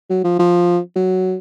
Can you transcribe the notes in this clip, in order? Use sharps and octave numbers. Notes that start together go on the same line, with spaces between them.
F#3
F3
F3
F#3